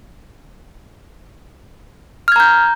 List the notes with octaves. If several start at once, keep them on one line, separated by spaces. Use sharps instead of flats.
A#5 F6 G6 G#6